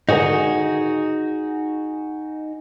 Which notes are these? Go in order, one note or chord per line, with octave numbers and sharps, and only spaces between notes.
G#2 D3 D#3 D#4 F#4 G#4